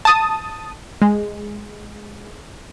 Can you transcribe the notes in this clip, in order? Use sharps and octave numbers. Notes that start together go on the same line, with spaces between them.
A5 D#6
G#3